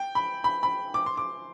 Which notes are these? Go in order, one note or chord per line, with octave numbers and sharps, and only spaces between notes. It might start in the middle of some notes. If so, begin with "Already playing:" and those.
Already playing: G5
B5
B5
B5
D6
C6
D6